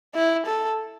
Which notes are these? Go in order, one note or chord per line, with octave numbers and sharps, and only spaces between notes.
E4
A4